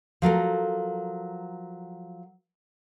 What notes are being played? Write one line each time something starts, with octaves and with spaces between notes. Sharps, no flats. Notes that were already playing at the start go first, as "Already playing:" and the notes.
F3 F#3 A4 A#4